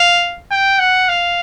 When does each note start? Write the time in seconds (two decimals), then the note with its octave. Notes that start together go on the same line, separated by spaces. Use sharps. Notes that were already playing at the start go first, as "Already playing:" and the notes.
Already playing: F5
0.51 G5
0.79 F#5
1.09 F5